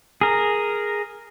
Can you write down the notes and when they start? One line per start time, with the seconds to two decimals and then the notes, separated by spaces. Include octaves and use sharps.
0.21 G#4 A#4